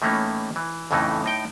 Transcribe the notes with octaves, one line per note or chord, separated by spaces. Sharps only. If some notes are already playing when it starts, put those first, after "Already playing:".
A2 E3 A3 A#3 C#4 D#4
E3
F2 A2 C#3 E3 A3 D#4
A2 D#4 G5